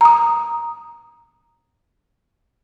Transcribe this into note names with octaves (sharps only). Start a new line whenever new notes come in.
A#5 D#6